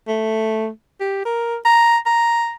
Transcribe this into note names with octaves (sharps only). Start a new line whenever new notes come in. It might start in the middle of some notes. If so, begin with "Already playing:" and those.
A3
G4
A#4
A#5
A#5